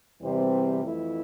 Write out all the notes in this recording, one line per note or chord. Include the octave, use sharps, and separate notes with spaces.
E2 C3 E3 G3 C4
F2 E3 A3 E4